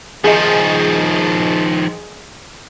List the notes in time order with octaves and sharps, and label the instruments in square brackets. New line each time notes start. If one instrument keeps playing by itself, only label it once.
[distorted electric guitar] D#3 F3 [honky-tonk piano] G#4 D#5